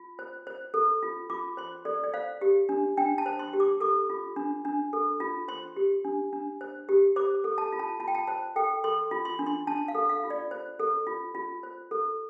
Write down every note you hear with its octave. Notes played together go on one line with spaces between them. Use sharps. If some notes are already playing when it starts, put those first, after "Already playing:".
Already playing: F4
C5
C5
A4
F4
F4 D6
C5 C6
A4 D5
D5
C5 F5
G4
D4
D4 G5
A5
C5
C6
G4
D6
A4 D6
F4
D4
D4
A4
F4
C5 C6
G4
D4
D4
C5
G4
C5 D6
A4
A5
F4
A5
F4 A5
G5
A5
C5 A5
A4 G5
A4 C6
F4
C6
D4
C6
D4 A5
F5
A4
F5
F4
D5
C5
A4
F4
F4
C5
A4